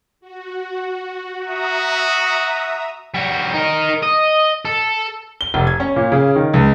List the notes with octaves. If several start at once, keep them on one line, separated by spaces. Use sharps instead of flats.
F#4
F#4 E5 A#5 D#6
G3 F#4
D#4 A#4
D#5
A4
G7
F1
G#6
C#4
A#2
C#3
D#3
C#2